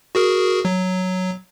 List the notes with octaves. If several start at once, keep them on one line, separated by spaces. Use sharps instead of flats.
F#4 G#4 A#4
F#3